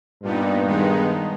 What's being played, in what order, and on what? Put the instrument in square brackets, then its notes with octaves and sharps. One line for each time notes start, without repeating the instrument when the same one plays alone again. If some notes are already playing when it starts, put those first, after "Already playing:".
[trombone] G2 [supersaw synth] A#2 G3 B3 D#4
[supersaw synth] D#3 G#3 B3 D#4